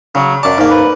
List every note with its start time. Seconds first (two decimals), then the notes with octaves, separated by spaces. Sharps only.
0.15 C#3 F#3
0.43 F#2 D5 A5
0.58 G#2 A#3
0.71 B4